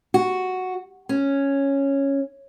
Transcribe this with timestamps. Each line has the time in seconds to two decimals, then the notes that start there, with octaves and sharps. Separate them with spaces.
0.14 F#4
1.09 C#4